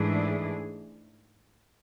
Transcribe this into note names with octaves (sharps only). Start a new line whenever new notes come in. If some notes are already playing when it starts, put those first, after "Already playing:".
Already playing: G#2 E3 A3 D4 G#4